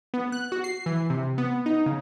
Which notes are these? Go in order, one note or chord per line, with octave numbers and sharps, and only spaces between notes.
B3
F#6
F#4
C7
E3
C3
B3
D#4
C#3